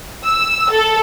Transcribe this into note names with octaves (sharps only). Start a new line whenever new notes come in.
E6
A4